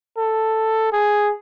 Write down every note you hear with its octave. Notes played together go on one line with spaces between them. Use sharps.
A4
G#4